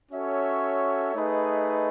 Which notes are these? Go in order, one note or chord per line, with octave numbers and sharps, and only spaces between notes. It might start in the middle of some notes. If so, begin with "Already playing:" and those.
C#4 F#4 A4 C#5 E5
A3 D#4 G#4 B4 D#5